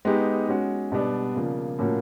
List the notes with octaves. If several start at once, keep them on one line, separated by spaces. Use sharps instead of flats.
G#3 B3 D#4 G4
G#3 C#4 F#4
B2 G3 B3 D4
C#3 F3 A#3
A2 F3 A#3 C#4 F#4